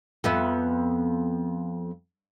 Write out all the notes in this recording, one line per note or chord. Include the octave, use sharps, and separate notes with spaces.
F2 B3 E5